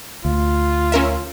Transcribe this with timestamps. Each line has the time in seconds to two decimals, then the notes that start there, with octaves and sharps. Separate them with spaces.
0.25 D2 F4
0.92 C#4 A#4 E5